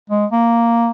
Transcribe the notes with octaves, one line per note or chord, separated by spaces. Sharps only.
G#3
A#3